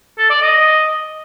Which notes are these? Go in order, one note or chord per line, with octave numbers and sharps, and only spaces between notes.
A4
D5
D#5